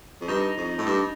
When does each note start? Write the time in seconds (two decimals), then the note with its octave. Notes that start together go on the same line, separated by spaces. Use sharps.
0.21 F2
0.28 G2 D#4
0.57 F2
0.78 A2
0.86 G2